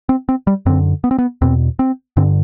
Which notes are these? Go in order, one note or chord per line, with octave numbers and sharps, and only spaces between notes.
C4
C4
G3
F#2 D3 C4
B3
C4
B3
E2 B2 C4
C4
G2 D3 C4